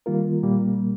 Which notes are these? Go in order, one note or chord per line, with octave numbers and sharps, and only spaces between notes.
D#3 G3 A#3 F4 A#4
A#2 G3 A#3